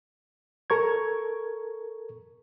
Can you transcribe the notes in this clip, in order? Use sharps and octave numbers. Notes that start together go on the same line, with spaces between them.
A4 A#4 C#6 G#6